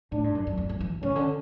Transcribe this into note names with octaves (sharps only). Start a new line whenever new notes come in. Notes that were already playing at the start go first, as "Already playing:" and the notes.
A2 D4
G2
F#2
F#2
E2
F#2
E3
C#3 C#4
D3